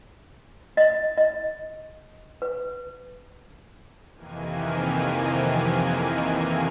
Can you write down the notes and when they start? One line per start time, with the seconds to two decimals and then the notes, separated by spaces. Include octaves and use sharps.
0.77 D#5
1.17 D#5
2.42 B4
4.14 F2 C3 D#3 E3 A#3 G#5